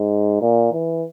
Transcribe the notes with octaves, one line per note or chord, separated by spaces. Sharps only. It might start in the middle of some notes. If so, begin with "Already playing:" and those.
Already playing: G#2
A#2
E3